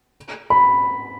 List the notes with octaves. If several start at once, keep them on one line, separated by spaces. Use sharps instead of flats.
B5